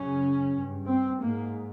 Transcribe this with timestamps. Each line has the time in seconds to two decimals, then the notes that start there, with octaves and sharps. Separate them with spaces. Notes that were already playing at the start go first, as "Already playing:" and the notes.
Already playing: F#2 C#3 C#4
0.54 G2
0.87 C4
1.20 G#2 A#3